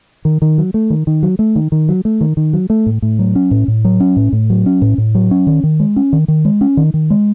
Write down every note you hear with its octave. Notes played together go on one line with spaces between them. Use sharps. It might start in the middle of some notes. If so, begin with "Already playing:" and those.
D#3
D#3
F#3
A3
D#3
D#3
F#3
A3
D#3
D#3
F#3
A3
D#3
D#3
F#3
A3
A2
A2
F#3
C#4
A2
A2
F#3
C#4
A2
A2
F#3
C#4
A2
A2
F#3
C#4
D#3
D#3
G#3
C#4
D#3
D#3
G#3
C#4
D#3
D#3
G#3